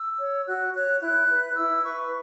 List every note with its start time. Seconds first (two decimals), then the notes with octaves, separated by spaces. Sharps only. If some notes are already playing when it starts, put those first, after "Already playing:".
Already playing: E6
0.20 C#5
0.47 F#4 F#6
0.74 C#5 F#6
1.01 E4 F#6
1.29 B4
1.56 E4 E6
1.84 B4 C#6